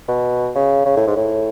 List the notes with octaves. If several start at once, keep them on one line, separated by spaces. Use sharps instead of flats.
B2
C#3
C#3
A2
G#2
A2